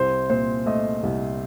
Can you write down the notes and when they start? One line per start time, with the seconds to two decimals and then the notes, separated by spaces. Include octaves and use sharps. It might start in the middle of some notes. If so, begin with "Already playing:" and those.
Already playing: C2 C5
0.30 A#2 C5
0.66 A3 D#5
1.03 C2